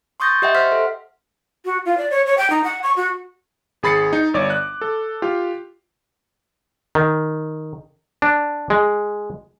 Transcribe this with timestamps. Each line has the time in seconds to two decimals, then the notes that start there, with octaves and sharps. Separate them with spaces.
0.20 C6 C#6 D#6 G6 A6 A#6
0.42 G4 D#5 E5 F#5 G5
0.55 C5 E5 F#5 C6 F6 B6
0.72 A4
1.65 F#4
1.86 F4
1.98 D5
2.11 C#5
2.26 C#5
2.38 G5
2.50 D#4
2.64 F#5
2.83 C#6
2.97 F#4
3.83 G#1 G#4 B5 A6 C7 C#7
4.13 D#4
4.34 G1 C#5 D5 D6
4.50 F#6
4.81 A4
5.22 F4 G4
6.95 D#3
8.22 D4
8.70 G#3